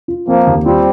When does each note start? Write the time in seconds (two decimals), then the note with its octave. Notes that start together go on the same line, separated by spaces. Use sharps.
0.08 F4
0.28 F3 A#3 C4
0.47 D#2
0.65 G3 C4 F4